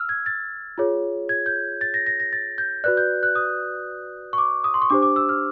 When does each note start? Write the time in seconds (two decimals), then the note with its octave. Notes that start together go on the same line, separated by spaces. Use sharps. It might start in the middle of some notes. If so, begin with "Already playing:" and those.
Already playing: E6 F6
0.09 G#6
0.26 A6
0.78 F4 G#4 C#5
1.29 G#6
1.46 G6
1.81 A6
1.94 A#6
2.07 A#6
2.20 A#6
2.33 A6
2.58 G6
2.84 F#4 B4 D5 F#6
2.97 G6
3.23 F#6
3.35 D#6
4.33 C#6
4.38 D6
4.64 D#6
4.74 C6
4.82 C#6
4.90 D4 G4 C5 D6
5.02 D6
5.16 E6
5.29 F6